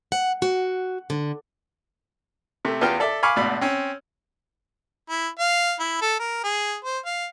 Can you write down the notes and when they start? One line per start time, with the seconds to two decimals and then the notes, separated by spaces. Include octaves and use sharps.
0.12 F#5
0.42 F#4
1.10 D3
2.65 C3 A3
2.81 E2 B3 F4 G4 G5 F6
3.00 A4 D5 E5
3.23 F5 G#5 B5 C#6 D6 F6
3.36 G#1 D2 B2 D5 B5
3.61 C4 C#4
5.09 E4
5.39 F5
5.79 E4
6.01 A4
6.19 A#4
6.44 G#4
6.84 C5
7.05 F5